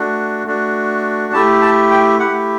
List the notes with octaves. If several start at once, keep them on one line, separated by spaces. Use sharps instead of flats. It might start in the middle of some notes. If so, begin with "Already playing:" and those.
Already playing: A3 D4 F#4
A3 D4 F#4
A3 E4 G4 A5
A5
G5
A3 E4 G4 F#5